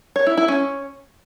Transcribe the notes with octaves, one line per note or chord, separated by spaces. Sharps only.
C#5
E4
E4
C#4